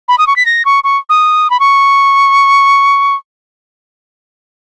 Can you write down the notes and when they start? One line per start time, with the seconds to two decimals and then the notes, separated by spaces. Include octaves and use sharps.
0.08 B5
0.18 D#6
0.27 C#6
0.36 B6
0.46 A#6
0.65 C#6
0.84 C#6
1.09 D#6
1.50 B5
1.60 C#6